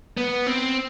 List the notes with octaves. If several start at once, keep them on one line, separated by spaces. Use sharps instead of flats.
B3
C4